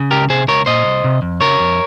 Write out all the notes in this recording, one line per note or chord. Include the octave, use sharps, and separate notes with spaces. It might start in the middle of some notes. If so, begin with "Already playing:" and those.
Already playing: C#3
C#2 G4 A#4
C3 G#4 C5
C#2 A#4 C#5
A#2 C5 D#5
C2
C3
F2
C#3 A#4 C#5
F2